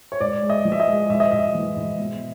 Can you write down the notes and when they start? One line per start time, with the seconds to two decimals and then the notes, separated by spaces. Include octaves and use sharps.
0.12 C#5
0.20 G#2 D5
0.42 G#3
0.50 D#5
0.65 F3
0.72 E5
0.80 D#5
0.87 G#3
1.09 G#2 E5
1.20 D#5
1.32 G#2 E5
1.55 E3
1.76 G#2
1.99 B2